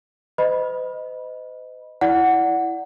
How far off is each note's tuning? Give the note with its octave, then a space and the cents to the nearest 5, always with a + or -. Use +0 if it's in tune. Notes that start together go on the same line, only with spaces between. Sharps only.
C5 -45 D#5 +0 B5 -15
E4 +0 D5 -15 F#5 +0